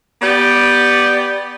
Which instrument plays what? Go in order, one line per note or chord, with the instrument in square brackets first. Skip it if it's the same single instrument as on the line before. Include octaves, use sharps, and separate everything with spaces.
[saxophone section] B3 G4 D5